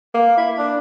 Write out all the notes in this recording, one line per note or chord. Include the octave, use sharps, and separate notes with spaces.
A#3
E4
D4